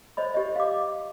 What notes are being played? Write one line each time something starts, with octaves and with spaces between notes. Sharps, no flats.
C5 C#5 D#5 B5
G4 C#5 D#5
F5 D6